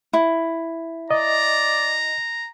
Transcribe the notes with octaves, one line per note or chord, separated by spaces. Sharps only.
E4
D5 D#5 A#5